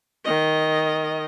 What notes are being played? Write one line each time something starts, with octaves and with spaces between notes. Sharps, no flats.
D#3 D#5